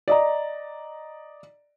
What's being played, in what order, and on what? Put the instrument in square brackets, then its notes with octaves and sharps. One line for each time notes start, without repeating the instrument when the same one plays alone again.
[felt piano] D5 D#5 A#5